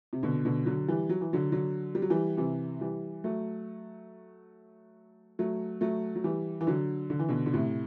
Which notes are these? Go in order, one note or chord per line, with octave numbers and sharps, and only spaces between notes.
C3
B2 D3
B2 D3
D3 F#3
E3 G3
F#3
E3
D3 F#3
D3 F#3
G3
F#3
E3 G3
C3 E3
E3 G3
F#3 A3
F#3 A3
F#3 A3
F#3
E3 G3
E3
D3 F#3
D3
E3
B2 D3
D3
A2 C3